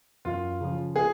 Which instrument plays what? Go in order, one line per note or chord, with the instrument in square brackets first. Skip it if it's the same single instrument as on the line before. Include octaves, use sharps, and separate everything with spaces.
[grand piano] F#2 F4
C#3 F3
G#4